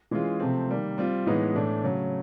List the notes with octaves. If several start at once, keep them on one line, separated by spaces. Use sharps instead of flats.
E3 G#3 C#4 F4 G#4
C3 F3 A3 C4
D#3 G3 A#3
G3 C4 F4
A2 E3 G#3 B3 D#4
A2 E3 A3 D4
C#3 F#3 A3